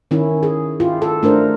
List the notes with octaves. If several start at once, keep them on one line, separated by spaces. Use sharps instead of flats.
D#3 C#4 E4
G#4
E4 F4 G4
A4
A3 D4 A#4 C5